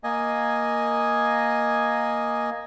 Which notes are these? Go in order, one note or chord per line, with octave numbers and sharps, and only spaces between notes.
A#3 D#5 G#5